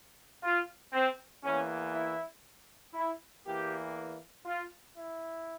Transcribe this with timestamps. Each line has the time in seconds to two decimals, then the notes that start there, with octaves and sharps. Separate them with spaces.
0.43 F4
0.93 C4
1.43 E2 E3 A#3 C#4
1.93 E4
2.94 E4
3.45 E2 E3 A#3 G4
4.46 F4
4.96 E4